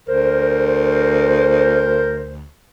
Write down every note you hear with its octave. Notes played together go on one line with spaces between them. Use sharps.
D2 A#4 C5